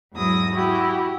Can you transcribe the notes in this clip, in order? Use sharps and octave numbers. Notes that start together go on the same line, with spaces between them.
E2 G#2 F#3 E4 D#6 A#6
E4 F#4 G4